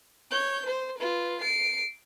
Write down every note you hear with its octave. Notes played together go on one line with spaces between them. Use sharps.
C#5 G6
C5
F4 B4
C7 D7